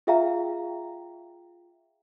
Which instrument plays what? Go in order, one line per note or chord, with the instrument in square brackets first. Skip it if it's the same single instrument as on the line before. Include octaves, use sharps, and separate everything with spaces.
[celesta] F4 G#4 E5 F5 G5 A#5